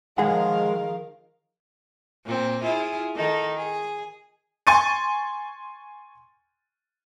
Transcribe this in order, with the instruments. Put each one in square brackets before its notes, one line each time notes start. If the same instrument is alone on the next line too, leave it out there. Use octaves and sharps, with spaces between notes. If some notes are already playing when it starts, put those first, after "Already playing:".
[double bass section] D#3 F3 [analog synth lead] G#3 [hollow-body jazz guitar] G#4 F#5 [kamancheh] A#4 F5
[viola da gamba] A#2 C4
E4 F4 G#4
D#3 D#4 A4
G#4
[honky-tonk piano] G#5 C6 C#6 A6 D#7